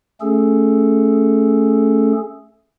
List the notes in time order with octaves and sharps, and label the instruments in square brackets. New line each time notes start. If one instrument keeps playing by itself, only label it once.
[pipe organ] A3 C#4 G#4 A4